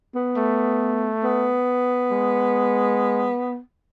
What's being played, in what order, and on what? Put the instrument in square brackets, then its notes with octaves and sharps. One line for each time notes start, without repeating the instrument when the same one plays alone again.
[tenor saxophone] B3
[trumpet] A3
[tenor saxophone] B3
[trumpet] G#3